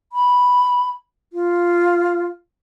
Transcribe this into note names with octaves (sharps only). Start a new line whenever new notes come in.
B5
F4